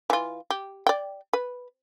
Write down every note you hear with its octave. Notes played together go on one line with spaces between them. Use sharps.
E3 F4
G4
D5 G5
B4